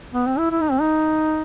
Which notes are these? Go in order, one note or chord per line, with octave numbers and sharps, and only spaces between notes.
B3
C4
E4
E4
D#4
C4
D#4